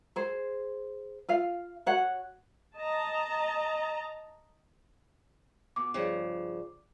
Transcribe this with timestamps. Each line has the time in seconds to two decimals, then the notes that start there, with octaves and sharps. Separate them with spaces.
0.16 G#4 C5
1.29 F4 F5
1.86 F#4 C#5 F#5
2.77 D#5 A5 A#5
5.76 B2 D6
5.94 G2 C#3 F3